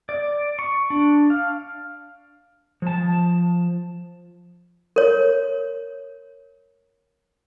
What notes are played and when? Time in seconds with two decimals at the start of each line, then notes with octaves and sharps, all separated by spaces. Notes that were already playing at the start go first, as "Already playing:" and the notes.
0.09 D5
0.59 C#6
0.90 D4
1.30 F5
2.82 F3 A5
4.96 A#4 C#5